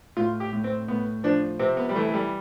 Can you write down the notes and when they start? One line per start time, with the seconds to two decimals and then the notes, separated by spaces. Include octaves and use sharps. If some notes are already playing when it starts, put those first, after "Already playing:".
0.17 A2 F4
0.40 G4
0.53 A2
0.64 C4
0.88 A2 B3
1.24 F3 D4
1.59 C3 C4
1.77 B3
1.89 G3
1.95 E3 A3
2.09 A3
2.14 G3